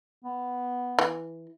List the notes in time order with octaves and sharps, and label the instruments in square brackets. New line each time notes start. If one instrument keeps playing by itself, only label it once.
[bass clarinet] B3
[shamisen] E3